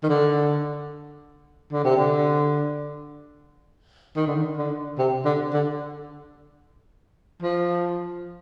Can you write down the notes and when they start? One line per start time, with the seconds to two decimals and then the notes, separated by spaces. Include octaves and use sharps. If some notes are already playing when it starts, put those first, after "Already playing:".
0.03 D#3
0.09 D3
1.72 D3
1.85 C3
1.96 D3
4.16 D#3
4.27 D3
4.36 D#3
4.57 D3
4.98 C3
5.25 D3
5.53 D3
7.42 F3